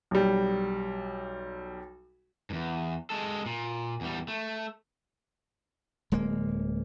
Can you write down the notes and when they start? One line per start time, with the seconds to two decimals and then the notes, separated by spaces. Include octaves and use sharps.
0.11 B1 G3
2.50 E2 G2
3.10 G#3 A4
3.46 A#2
4.01 E2 G3
4.28 A3
6.12 D1 G#3 A#3